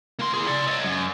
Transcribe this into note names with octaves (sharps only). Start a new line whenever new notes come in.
A#3 C6
E4 G#4
D5 C6
C#5 D#5
F#2